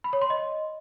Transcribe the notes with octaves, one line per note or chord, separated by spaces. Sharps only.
B5
C#5
C6
D#5